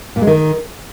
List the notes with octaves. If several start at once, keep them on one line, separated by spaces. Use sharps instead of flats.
A#2
G#3
D#3